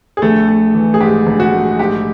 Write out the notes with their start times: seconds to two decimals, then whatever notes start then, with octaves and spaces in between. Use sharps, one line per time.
0.17 G#4
0.22 A#1 A3 A4
0.48 A3
0.74 E3
0.94 G#4
1.00 G#2 G4
1.27 A#1
1.40 F#4
1.53 A3
1.79 G#2 G4